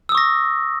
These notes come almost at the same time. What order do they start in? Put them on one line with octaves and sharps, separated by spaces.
E6 D#6 C#6 A#6